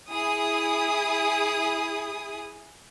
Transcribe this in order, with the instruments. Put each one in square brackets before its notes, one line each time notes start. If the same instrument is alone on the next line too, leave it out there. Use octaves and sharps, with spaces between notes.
[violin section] E4 G#4 D#6